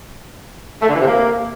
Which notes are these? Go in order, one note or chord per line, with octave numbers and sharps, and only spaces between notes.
A3
D3
E3
C3
A#3